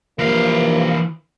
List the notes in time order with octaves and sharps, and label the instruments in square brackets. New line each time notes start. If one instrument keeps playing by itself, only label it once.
[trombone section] G2 F3 A#3 [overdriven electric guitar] E3 F5